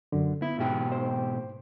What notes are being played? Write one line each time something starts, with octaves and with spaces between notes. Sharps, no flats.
F#2 D3
B3 E4
G#2 B2 G4
C5